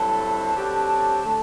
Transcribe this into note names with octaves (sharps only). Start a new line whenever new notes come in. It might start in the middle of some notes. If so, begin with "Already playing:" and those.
Already playing: G2 F#3 C4 E4 A4 A5
D3 F#3 C4 G4
D3 A3